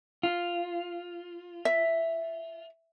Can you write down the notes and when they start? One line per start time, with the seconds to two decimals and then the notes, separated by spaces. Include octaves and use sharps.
0.23 F4
1.65 E5